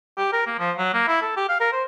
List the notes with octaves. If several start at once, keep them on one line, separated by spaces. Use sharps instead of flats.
G4
A#4
A#3
F3
F#3
A#3
E4
A4
G4
F5
A#4
C5